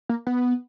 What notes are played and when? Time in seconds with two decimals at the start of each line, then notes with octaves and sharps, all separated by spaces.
0.09 A#3
0.27 B3